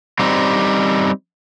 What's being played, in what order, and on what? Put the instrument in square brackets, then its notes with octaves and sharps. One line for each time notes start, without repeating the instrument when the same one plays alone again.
[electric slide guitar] G3 C4 D#4